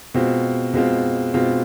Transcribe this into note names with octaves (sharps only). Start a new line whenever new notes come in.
B2 G#3 C4 F4
B2 G#3 C4 F4
B2 G#3 C4 F4